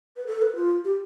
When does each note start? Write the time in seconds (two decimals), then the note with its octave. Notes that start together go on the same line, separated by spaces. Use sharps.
0.17 B4
0.27 A4
0.42 B4
0.56 F4
0.85 G4